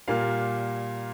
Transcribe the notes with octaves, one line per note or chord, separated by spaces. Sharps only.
A#2 G3 A#3 F4 F5